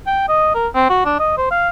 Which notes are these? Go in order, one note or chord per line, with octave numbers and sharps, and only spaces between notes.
G5
D#5
A#4
C4
F#4
D4
D#5
C5
F5